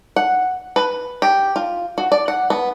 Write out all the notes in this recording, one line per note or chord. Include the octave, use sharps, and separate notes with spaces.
F#5
B4
G4
F4
F#4
D5
F#5
B3